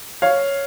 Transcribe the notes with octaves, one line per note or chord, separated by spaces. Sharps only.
C#5 F5